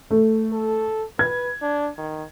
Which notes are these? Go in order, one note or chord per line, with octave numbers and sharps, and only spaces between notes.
A3
A4
B4 G#6
D4
D#3